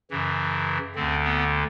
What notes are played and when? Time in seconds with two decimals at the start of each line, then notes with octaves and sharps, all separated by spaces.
0.11 F#2 C#3 E3
0.95 D2 D3 C4
1.24 B3